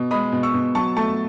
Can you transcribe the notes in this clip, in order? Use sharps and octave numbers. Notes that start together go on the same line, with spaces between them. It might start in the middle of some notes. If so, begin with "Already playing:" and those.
Already playing: B2
G#3 B5 D#6
B2
C#6 E6
B2
F#3 A5 C#6
A3 A5 C#6